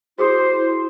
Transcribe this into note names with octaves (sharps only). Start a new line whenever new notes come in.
E4 F#4 G#4 C5 D#6